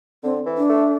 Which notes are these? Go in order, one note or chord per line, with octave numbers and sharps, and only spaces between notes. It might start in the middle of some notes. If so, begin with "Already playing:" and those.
D3 C4
E3
D4
A3